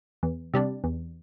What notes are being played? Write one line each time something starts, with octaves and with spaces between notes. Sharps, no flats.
E2
C3 G3 D4
E2